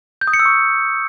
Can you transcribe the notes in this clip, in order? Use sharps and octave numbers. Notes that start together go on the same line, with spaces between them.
G6
D#6
C#7
E6
C#6